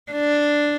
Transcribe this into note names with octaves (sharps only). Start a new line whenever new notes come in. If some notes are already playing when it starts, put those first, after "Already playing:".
D4